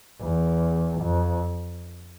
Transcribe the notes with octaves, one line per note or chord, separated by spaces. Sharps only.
E2
F2